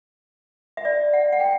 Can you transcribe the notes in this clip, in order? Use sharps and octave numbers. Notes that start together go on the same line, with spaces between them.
E5
D5
F#5
F#5
G5